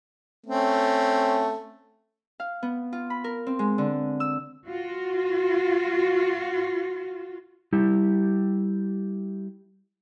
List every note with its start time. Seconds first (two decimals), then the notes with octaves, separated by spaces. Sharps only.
0.47 A3 C4 C#4
2.40 F5
2.63 B3
2.93 F4
3.10 B5
3.24 A#4
3.47 C4
3.59 G#3
3.78 D3
4.20 E6
4.67 F4 F#4
7.73 G3 E4 G4